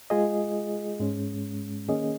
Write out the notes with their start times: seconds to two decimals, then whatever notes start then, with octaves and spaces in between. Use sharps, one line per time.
0.10 G#3 F4 G#4 D#5
1.00 G#2 G#3 C#4
1.89 D#3 A#3 C#4 G#4 D#5